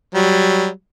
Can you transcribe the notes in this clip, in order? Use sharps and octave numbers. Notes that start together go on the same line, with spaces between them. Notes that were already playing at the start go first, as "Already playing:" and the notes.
F#3 G3